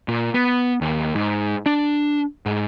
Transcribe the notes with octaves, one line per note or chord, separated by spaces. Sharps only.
A#2
B3
D#2
G#2
D4
G#2